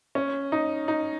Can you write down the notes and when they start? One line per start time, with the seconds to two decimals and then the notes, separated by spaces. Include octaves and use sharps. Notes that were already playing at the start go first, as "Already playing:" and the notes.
0.15 C#4
0.52 D#4
0.88 D#4